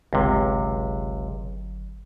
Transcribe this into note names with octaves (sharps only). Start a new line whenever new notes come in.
G1 C#2 C3 F#3